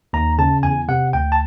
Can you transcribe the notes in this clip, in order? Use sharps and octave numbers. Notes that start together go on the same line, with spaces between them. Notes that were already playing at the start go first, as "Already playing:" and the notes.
D#2 A#5
C#3 A5
E2 G#5
C3 F#5
D2 G5
A5